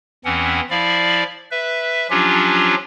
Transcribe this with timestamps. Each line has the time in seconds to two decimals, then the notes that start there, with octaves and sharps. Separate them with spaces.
0.25 E2 E3 C4 C#4 F#5
0.70 F3 E4 D5 F5
1.51 B4 E5
2.10 F3 F#3 C#4 D4 F4 G4